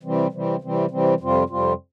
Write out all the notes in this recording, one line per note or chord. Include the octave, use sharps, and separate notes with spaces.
C3 E3 G3 C4
C3 E3 G3 C4
C3 E3 G3 C4
C3 E3 G3 C4
F2 C3 G3 C4 F4
F2 C3 G3 C4 F4